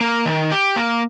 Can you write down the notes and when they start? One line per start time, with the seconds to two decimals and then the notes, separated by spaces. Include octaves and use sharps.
0.01 A#3
0.26 D#3
0.52 G4
0.76 A#3